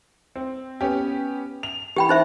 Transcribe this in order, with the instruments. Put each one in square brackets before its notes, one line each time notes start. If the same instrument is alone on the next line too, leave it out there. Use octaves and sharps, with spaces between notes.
[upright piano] C4
B3 C#4 G4
F7
[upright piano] E3 [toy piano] G4 G5 B5
[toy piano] D#4 C5 E5